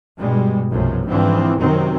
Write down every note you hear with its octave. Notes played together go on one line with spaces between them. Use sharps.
G2 B2 G3 G#3
B1 F#2 C3 F3 A3
G#2 D3 E3 F3 C4
F#2 C3 D#3 F#3 C4